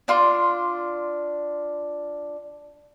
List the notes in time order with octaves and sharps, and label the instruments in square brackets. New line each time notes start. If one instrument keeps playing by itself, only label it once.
[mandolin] D4 F4 C6 D6